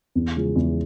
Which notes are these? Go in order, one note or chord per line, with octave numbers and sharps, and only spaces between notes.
E2
C#3 F3 G#3
E2